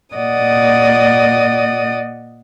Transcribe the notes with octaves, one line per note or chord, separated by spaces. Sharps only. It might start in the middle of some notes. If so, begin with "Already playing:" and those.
A#2 D5 D#5 F#5 D#6